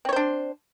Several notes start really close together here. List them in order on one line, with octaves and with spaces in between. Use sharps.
C4 C#5 C5 D4